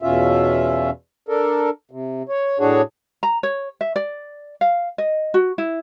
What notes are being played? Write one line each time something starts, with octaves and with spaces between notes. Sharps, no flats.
E2 B2 C#4 F4 E5
D4 A4 A#4
C3
C#5
A2 D4 F#4 G#4 C#5
A#5
C#5
E5
D5
F5
D#5
F#4
E4